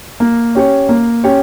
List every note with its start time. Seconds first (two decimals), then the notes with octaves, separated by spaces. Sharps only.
0.20 A#3
0.55 C#4 G4 C#5
0.89 A#3
1.24 C#4 G4 C#5